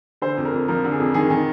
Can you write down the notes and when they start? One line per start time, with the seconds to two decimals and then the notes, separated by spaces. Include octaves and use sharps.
0.22 D3 C5
0.37 F2
0.45 A#4
0.53 F2
0.68 F3 A#4
0.84 D3
0.92 G#4
1.00 F2
1.14 D#3 G#4
1.30 D#3